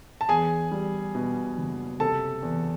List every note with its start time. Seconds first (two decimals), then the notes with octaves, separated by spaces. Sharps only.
0.21 A5
0.29 E2 G#4 G#5
0.71 G3
1.15 B2
1.58 F#1
2.00 C3 A4 A5
2.42 E2